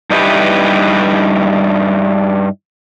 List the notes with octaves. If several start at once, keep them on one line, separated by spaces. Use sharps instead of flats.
G2 D#4 E4 G4 B4